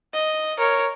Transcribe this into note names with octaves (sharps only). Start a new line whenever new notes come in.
D#5
A#4 C#5